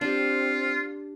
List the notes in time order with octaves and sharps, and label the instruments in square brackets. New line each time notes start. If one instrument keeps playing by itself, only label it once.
[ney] C4 [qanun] D4 G4 [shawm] F4